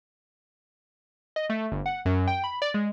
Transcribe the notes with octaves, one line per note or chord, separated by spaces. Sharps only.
D#5
A3
G1
F#5
F#2
G5
B5
D5
G#3